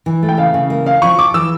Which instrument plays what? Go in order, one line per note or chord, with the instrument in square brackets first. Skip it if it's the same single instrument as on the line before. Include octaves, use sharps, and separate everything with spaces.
[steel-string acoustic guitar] E3
A3
[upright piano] G5
[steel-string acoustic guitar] C#3 [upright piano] F5
[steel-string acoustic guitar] C#3
A#3
[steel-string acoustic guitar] C#4 [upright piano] F5
[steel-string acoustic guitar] F3 [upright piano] C#6
[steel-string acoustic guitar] F3 [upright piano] D6
[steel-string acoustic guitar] E3 [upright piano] E6